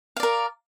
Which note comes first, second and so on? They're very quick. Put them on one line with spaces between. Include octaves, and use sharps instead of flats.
F5 D5 A#4